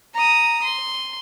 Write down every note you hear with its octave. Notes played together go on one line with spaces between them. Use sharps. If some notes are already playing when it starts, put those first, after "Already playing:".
A#5 D#6
C6